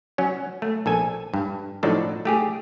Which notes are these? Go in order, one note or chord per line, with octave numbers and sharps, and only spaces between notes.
F#3 C#4
A3
A#1 A4 G#5
G2
A2 F3 F#3 D4 D#4 A4
A3 G4 G#4